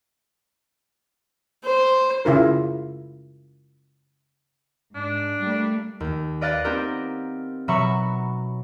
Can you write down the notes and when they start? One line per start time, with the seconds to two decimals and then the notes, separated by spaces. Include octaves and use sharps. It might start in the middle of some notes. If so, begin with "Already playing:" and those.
1.65 C5
2.25 C#3 E4 F4 A#4
4.95 G#2 D4
5.41 G3 A3 A#3
6.00 D#2
6.41 B4 D5 D#5 F5 F#6 A6
6.64 B3 C4 D#4 G4 A#4
7.68 B2 F#3 E5 A#5 B5 C#6